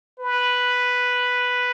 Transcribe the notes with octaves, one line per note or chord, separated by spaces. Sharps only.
B4